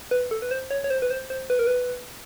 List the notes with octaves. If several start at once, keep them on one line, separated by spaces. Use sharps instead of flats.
B4
A4
B4
C5
C#5
C#5
C5
B4
C5
C5
B4
A#4
B4